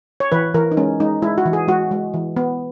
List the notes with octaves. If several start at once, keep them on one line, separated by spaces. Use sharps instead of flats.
C#5
E3 B4
E3 A#4
D#4
G#3 C#4
G#3 D#4
G#3 E4
F#4
E3
G#4
G#3 F#4
G#3
E3
B3